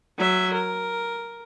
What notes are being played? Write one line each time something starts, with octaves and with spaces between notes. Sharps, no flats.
F#3 E5
A#4